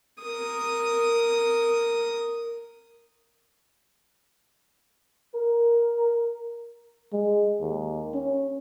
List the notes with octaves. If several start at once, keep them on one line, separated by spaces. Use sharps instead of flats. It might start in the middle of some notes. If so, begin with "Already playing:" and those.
A#4 D#6
A#4
G#3
D#2
C#4